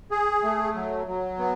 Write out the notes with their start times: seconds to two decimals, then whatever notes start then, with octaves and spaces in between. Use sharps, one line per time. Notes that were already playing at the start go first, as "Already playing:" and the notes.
0.11 G#4
0.44 A3
0.75 F#3
1.07 F#3
1.39 B3